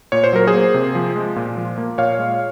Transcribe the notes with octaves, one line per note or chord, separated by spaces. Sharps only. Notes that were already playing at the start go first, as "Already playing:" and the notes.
A#2 C#5
C5
F#3 A#4
G#4 C5
A#3
C3
F3
G#3
A#2
F3
A#3
A#2 C#5 F5
G#3